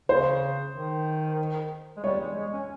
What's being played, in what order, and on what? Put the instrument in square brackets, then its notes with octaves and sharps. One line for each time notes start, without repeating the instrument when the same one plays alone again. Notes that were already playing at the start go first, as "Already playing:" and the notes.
[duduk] C#3 [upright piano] C5
[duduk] D#3
G#3
[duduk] G3 [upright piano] C#5
[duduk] G#3
G#3
C#4